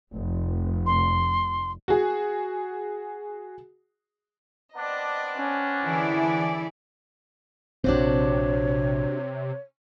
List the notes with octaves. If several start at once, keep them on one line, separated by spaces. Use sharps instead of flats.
F1
C6
F#4 G#4
B3 C4 D4 D5 D#5
C#4
D3 E3 E4 G#4 D5 G#5
A#1 C3 C4 D4 F#4 C5 C#5